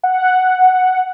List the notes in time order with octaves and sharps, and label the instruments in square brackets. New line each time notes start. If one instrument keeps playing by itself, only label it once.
[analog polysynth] F#5